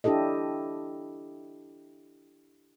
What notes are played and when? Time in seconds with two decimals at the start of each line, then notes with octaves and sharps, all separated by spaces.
0.04 D4 E4 G4 A4 D#5